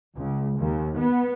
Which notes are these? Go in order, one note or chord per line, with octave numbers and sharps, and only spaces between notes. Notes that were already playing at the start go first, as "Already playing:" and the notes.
C#2
D#2
B3